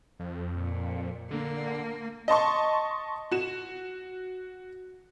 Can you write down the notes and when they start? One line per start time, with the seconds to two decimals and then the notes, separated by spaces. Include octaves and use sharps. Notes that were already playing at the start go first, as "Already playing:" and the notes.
0.19 F2
0.56 A#2
1.31 D3 A#3
2.28 D#5 A5 C6 C#6
3.31 F#4 E7